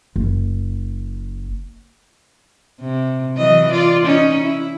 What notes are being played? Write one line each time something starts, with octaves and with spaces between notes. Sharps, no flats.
F#1
C3
E3 F#3 D#5
F4 D5
C#4 D#4
E4